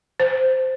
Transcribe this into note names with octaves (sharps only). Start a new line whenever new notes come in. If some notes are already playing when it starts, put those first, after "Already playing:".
C5